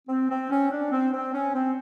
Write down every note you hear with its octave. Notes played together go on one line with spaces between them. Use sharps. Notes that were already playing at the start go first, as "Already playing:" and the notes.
C4
C4
C#4
D4
C4
C4
C#4
C4